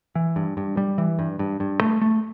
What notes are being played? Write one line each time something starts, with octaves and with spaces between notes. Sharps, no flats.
E3
G2
G2
G3
E3
G2
G2
G2
A3
A3